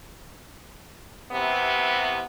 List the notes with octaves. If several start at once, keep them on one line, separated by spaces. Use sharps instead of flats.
C3 E3 B3